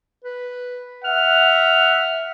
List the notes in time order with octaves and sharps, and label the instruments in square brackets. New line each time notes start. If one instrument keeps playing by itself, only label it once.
[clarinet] B4
[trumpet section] E5 F#5 [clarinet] F6